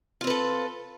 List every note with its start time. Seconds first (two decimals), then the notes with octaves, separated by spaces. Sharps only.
0.21 F4
0.24 C4
0.27 B4
0.30 A4